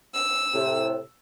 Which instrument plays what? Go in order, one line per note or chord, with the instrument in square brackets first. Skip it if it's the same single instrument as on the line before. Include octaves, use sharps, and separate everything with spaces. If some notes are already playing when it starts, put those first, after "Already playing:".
[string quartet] E6
[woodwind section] A2 C3